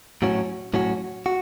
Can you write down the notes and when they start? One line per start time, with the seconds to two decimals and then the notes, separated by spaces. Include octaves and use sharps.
0.22 A2 F#3 C#4 F#4
0.74 A2 F#3 C#4 F#4
1.26 F#4